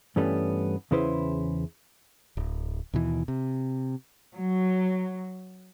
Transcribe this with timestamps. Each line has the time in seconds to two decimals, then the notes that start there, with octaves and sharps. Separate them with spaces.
0.16 G2 E3 G3 A3 B3 C#4
0.91 E2 C#3 C#4 E4 B4 C5
2.37 D1
2.93 D#2 B2 E3
3.28 C3
4.34 F#3